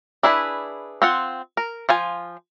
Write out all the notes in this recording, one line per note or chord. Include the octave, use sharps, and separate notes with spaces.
D4 E4 G#4 B4
C4 F4 F#5
A#4
F3 F4 G#5